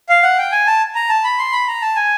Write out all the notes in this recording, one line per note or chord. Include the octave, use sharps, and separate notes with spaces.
F5
F#5
G5
G#5
A5
A#5
A5
B5
C6
B5
A#5
A5
G#5